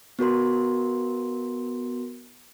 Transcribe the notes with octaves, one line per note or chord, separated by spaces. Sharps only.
B3 F#4 A#4 C6